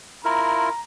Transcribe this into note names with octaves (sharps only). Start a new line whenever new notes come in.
E4 F4 A#4 A#5